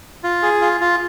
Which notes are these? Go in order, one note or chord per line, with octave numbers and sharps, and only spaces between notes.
F4
G#4
F4
F4